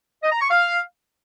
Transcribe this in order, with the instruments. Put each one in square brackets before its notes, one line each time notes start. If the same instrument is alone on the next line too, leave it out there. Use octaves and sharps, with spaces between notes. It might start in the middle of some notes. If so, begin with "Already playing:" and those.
[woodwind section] D#5
A#5
C#6
F5